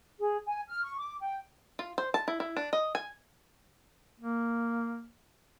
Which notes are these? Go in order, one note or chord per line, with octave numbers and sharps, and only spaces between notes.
G#4
G#5
F6
C#6
D6
G5
F4
C5
A5
E4
E4
D4
D#5
G#5
A#3